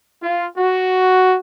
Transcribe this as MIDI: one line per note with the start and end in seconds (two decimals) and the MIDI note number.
0.22 0.46 65
0.57 1.37 66